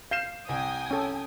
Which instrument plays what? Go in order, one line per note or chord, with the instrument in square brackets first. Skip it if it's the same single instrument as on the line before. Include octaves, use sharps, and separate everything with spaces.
[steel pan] F5 [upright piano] G6 C7 E7
[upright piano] C2 [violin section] G5 G#5 D#6
[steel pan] C#4 A4